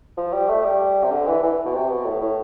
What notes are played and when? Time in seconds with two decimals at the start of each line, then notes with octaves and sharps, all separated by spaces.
0.17 F3
0.33 G3
0.49 A3
0.64 G3
1.04 C3
1.11 D3
1.27 E3
1.43 E3
1.65 B2
1.74 C3
1.89 B2
2.05 A2
2.21 A2